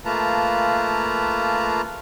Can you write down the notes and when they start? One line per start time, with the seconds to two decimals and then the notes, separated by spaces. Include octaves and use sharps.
0.05 A3 A#3 F4 B4 A5 A#5